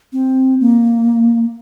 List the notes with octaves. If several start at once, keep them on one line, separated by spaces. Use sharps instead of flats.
C4
A#3